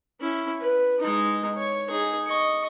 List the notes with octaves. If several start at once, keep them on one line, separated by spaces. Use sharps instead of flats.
C#4 E4
B4
G#3 D#4
C#5
D#4 G#4
D#5 C#6